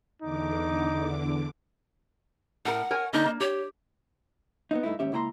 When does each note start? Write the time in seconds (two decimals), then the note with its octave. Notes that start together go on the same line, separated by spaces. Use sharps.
0.22 E2 D3 D#4 D6
2.65 A2 A#4 F#5
2.91 A#4 C#5 G#5
3.13 D3 A#3 D#4 D#5
3.26 A#3
3.40 G4 C#5
4.71 B3 C4 D#4
4.83 G2 A3 D#4 E4
4.99 D#2 G#2 C#4 G4 E5
5.12 C#2 A#3 E4 G5 A#5 C6